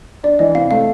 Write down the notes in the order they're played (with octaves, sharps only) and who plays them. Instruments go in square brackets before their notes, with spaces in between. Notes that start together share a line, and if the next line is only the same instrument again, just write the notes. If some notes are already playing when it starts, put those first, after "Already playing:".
[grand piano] D4 [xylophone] D5
[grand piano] E3 [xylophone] D#5
[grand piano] C3 [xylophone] F5
[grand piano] A3 [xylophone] F5